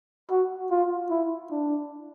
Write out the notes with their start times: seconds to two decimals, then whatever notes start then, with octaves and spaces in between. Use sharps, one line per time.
0.31 F#4
0.71 F4
1.10 E4
1.51 D4